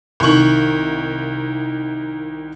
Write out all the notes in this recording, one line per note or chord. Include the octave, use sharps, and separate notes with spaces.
C2 D#3 C#6 F#7